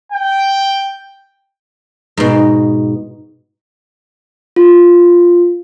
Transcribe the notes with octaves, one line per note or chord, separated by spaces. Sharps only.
G5
G#2 B2
F4